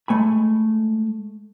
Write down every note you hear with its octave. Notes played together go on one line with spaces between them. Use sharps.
G#3 A3 G#5 B5